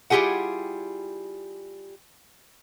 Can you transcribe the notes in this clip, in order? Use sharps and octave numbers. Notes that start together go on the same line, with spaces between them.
G3 E4 F4 G4 G#4 F#5